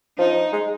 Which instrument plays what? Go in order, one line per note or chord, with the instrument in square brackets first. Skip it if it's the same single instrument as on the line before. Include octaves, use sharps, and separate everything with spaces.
[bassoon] F3 [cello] D#4
[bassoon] G#3